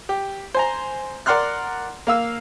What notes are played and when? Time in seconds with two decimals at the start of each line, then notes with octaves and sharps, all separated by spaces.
0.09 G4
0.55 C5 G#5 A#5
1.26 A#4 D5 F#5 C6 F6 F#6
2.07 A#3 F5 E6